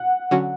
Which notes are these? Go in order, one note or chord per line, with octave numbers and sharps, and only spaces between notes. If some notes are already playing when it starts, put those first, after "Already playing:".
Already playing: F#5
D3 F#3 C#4 F#4